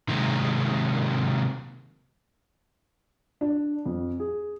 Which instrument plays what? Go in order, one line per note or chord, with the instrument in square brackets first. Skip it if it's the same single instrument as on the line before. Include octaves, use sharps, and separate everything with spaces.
[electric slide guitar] C3 D#3 F#3 G#3 A#3
[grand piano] D4
F2
G#4